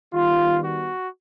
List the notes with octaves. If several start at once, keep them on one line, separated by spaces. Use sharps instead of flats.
D#3 G3 B3 F4
F#4